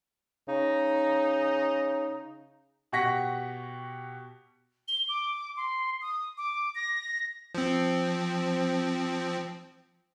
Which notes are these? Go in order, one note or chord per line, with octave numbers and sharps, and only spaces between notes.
C#3 D#4
B2 G4 F#5 C#6 A#6 B6
G7
D6
C6
D#6
D6
A#6
F3 C4